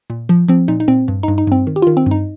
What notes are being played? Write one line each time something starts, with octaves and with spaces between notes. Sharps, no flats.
A#2
F3
F3 C4
A#2 D#4
D#4
A#2 C4
G2
G2 D#4
D#4
G2 C4
D#3
G4
D#3 F4
C4
G2 D#4